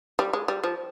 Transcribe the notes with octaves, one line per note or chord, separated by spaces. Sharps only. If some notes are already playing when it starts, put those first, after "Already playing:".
G3
G#3
G3
F3